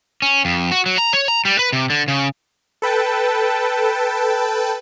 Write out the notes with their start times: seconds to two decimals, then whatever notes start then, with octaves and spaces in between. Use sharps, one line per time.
0.22 C#4
0.45 F2
0.71 F#4
0.86 F#3
0.98 A#5
1.13 C#5
1.28 A#5
1.45 G3
1.59 B4
1.73 C3
1.90 D3
2.08 C#3
2.82 A4 B4 G5 A5